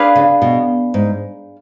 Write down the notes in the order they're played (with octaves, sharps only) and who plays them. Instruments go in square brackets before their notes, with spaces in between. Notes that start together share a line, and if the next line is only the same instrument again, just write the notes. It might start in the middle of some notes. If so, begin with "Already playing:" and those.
Already playing: [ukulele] D4 G#4 B4 F5
[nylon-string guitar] C#3
B2
G#2